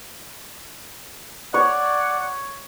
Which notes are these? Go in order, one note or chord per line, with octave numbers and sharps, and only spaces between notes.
C#5 D5 F#5